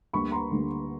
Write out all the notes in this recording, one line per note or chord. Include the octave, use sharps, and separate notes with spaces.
D2 D3 G3 A#3 B5 C#6
A#5 C6
D2 D3 G3 A#3